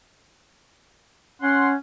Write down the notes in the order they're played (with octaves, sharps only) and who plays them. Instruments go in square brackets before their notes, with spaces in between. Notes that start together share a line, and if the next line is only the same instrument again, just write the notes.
[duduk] C#4 [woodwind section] F#5 C6